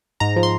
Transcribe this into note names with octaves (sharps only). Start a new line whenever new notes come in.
G#2 A#5
F3
C6